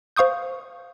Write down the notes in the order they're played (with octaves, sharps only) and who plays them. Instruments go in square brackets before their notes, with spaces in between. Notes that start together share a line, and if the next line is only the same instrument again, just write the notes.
[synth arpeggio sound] C5 F5 C#6 D#6 G6